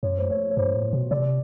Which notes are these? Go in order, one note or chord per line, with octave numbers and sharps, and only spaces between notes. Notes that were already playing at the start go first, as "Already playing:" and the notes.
F#2 C#5
C5
C#5
C#5
G2 C5
A2
B2
C3 D5